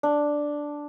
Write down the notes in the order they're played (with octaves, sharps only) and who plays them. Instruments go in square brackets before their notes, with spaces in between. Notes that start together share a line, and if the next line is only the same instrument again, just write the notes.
[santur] D4